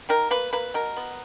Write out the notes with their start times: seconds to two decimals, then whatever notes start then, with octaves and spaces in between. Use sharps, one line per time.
0.09 D#3 A#4
0.30 A#3 B4
0.53 A#3 B4
0.74 B2 A#4
0.97 B3